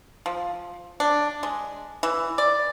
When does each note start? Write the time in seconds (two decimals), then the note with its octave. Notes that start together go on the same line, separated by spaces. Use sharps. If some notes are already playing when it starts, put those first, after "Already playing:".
0.26 F3
1.00 D4
1.43 G#3
2.03 E3
2.38 D5